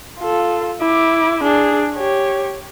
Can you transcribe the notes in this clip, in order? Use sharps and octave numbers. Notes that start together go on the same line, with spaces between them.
F4 A4
E4 D6
D4 G#4
G4 C#5